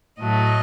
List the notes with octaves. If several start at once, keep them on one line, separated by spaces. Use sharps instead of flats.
A2 F#3 A3 D#5